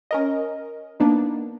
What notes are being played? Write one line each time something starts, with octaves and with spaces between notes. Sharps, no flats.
C#4 A#4 D#5
A#3 B3 D4 D#4